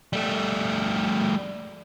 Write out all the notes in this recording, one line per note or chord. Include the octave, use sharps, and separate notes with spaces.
G3 A3